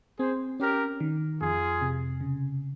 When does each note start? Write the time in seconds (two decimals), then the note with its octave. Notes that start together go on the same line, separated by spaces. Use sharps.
0.19 C4 G#4 C5
0.60 C#4 G4 A#4
1.00 D#3
1.40 F2 F4 G#4
1.81 C3
2.21 C#3